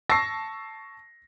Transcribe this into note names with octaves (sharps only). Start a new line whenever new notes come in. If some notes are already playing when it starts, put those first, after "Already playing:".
A5 C#6 E6 A#6 C7